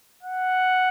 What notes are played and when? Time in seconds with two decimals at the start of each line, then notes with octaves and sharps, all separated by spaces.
0.23 F#5